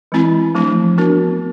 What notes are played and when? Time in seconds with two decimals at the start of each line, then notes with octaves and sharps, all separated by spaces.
0.12 E3 G#3 C4 E4
0.54 F3 A3 D4
0.98 B3 D4 F#4 A#4